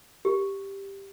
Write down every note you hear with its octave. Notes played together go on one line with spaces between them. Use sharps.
G4